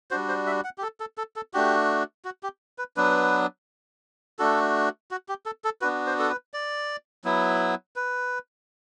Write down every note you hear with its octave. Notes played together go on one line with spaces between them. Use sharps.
G3 D4 F#4 C5
C5
E5
F#5
G4
A4
A4
A4
A4
A3 D4 F#4 G4
F#4
G4
B4
F#3 B3 D4 B4
A3 D4 F#4 A4
F#4
G4
A4
A4
B3 D4 F#4 B4
C5
A4
B4
D5
F#3 B3 E4
B4